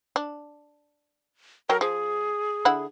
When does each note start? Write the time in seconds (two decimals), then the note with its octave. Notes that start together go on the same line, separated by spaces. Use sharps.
0.16 D4
1.69 F#3 A4 A#4 G5
1.81 F3 G#4
2.65 D3 E4 F#5